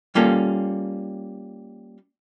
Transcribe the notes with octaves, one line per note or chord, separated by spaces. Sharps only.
G3 A#3 C#4 F4 A4